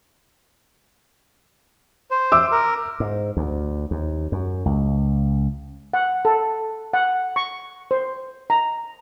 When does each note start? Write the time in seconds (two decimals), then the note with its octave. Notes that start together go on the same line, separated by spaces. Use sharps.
2.11 C5
2.32 E5 D6 E6
2.52 A#4
3.00 G#2
3.37 D2
3.91 D#2
4.32 F#2
4.66 C#2
5.94 F#5
6.25 A4
6.93 F#5
7.36 C#6
7.91 C5
8.50 A#5